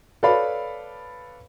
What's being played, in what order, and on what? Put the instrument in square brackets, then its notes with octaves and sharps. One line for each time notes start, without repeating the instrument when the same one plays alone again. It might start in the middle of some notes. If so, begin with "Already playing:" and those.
[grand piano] A4 B4 C#5 D5 F5 B5